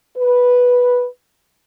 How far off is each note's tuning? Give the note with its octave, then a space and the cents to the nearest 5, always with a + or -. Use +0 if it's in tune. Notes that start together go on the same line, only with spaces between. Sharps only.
B4 -5